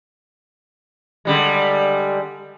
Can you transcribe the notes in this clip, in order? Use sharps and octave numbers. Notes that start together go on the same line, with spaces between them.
D3 G3 G#3